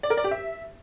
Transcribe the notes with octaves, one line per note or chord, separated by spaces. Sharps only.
D5
A#4
D5
G4
E5